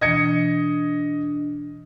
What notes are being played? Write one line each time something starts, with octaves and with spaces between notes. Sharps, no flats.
B2 E3 D4 D#5 G#6 C#7